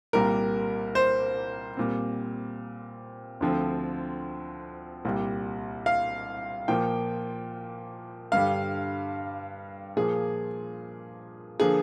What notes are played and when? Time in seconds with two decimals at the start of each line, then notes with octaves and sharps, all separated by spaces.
0.13 C2 A#2 G3 A#3 A#4
0.95 C5
1.77 A#2 G3 C4
3.41 D2 D3 F3 C4
5.05 C2 A#2 G3
5.86 F5
6.68 A#2 F3 A#3 G5
8.32 G2 D3 G3 F5
9.96 A#2 F3 A#3 G#4
11.60 D3 F3 A#3 G#4